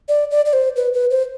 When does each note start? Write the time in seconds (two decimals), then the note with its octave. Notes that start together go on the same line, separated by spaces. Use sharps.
0.09 D5
0.31 D5
0.46 D5
0.53 C5
0.76 B4
0.94 B4
1.11 C5